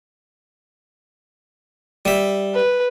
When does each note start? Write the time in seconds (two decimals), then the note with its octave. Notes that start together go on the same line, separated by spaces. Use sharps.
2.05 G3 E5
2.55 B4